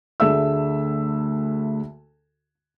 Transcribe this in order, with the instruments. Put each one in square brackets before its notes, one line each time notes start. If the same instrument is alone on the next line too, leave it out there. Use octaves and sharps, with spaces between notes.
[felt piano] D2 D3 G#4 E5 E6